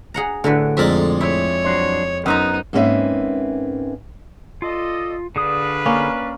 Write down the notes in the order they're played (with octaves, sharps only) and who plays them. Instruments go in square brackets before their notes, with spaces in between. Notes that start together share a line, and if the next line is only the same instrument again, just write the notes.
[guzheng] G#4 F#5 A#5
[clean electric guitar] A2 [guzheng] D3 F#4 B4
[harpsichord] F2 G#3 D5 [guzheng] A#4 E5
[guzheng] E4 [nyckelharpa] C#5
[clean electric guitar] F#3 D4 C5
[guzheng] F#2 C5 A#5 [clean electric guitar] B3 [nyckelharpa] D#4
[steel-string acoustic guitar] G#2 A#3 C4 C#4 B4 E5
[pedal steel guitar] F4 [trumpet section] A4 D5 D#5
[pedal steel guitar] D3 G#4 D#6 [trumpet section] D4 F4 B4
[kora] A#3 C#4